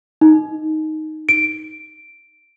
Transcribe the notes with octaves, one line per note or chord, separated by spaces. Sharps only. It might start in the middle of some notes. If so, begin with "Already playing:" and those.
D#4
D7